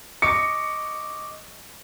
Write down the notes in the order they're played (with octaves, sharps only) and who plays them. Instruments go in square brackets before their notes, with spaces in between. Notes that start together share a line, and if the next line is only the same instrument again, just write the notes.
[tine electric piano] D#5 C#6 D6 [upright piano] C#7